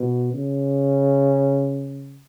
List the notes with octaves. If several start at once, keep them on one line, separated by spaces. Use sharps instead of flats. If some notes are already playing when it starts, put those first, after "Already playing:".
Already playing: B2
C#3